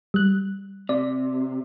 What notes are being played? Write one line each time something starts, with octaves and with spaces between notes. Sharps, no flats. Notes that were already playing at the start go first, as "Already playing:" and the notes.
G3 F#6
C3 D5